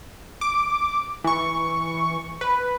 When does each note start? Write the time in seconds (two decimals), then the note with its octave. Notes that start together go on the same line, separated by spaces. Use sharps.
0.41 D6
1.24 E3 C#6
2.41 B4